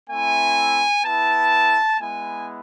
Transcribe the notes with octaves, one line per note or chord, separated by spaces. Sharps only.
A3 C4 E4 G#5
B3 E4 A5
G#3 B3 E4 G#5